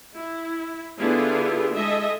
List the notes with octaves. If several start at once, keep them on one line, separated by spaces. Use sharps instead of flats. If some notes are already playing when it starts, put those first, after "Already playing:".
E4
D3 B3 E4 F4 G4 G#4
G#3 A4 D#5 E5